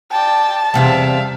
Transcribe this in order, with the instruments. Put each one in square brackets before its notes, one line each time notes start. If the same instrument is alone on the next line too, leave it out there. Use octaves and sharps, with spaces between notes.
[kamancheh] D5 G5 [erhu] A5
[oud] E2 C3 G3 [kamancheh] E5 F5